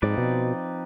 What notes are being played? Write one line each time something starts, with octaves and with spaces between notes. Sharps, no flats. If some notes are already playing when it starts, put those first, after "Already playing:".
G#2 F3 C4 D#4 B4 D5
B2